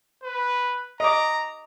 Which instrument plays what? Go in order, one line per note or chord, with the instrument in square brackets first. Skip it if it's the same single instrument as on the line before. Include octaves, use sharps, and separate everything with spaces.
[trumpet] B4
[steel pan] D#5 D6 [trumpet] A#5